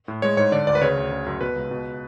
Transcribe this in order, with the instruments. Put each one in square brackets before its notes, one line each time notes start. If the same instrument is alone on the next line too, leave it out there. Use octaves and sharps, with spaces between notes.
[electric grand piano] A2
G#3 C#5
G#2 C#5
D3 D5
D2 D5
B4
C#3 C#5
D2
C#3
F#2
B2 B4
C#2
B2